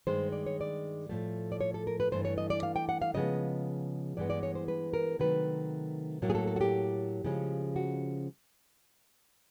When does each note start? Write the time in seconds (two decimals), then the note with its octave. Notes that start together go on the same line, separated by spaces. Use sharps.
0.07 G2 D#3 G#3 C5
0.32 D5
0.46 C#5
0.61 D5
1.09 A2 F3 A3
1.52 D5
1.61 C#5
1.74 A4
1.87 A#4
2.00 B4
2.12 G2 E3 A3 C5
2.25 C#5
2.38 D#5
2.50 D5
2.63 F5
2.76 G5
2.89 F#5
3.02 F5
3.14 C#3 F3 G#3 B3 D#5
4.17 G2 E3 G#3 B3 D5
4.30 D5
4.43 C#5
4.55 C5
4.68 B4
4.94 A#4
5.19 C3 D#3 F#3 A3 B4
6.22 A2 F#3 A#3
6.30 G#4
6.35 A4
6.47 A4
6.56 F#4
6.61 G4
7.24 C#3 F3 G#3 C#4
7.76 F#4